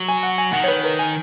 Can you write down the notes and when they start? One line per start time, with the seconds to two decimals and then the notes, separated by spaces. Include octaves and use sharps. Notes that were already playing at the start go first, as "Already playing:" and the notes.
Already playing: F#3
0.09 G#5
0.23 F#5
0.38 G#5
0.53 D#3 F#5
0.64 C#5
0.68 B4
0.84 A#4
0.99 G#5